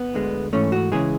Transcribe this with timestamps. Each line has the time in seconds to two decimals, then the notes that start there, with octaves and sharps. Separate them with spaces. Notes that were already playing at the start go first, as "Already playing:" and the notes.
Already playing: B3
0.15 D2 D3 G#3
0.53 G#2 E3 A3 C#4
0.72 F#4
0.92 C#3 E3 G#3 G#4